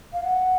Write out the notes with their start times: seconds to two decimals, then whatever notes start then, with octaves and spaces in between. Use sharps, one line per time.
0.13 F5
0.24 F#5